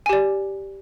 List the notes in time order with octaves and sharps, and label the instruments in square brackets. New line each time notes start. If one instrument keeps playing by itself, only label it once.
[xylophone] G#5
G4
D5